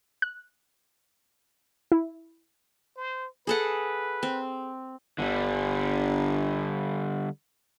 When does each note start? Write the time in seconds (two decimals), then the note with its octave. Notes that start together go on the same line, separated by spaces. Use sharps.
0.22 F#6
1.92 E4
2.97 C5
3.47 G#4 A4 B4 F#5
4.23 C4
5.18 G1 D3 G3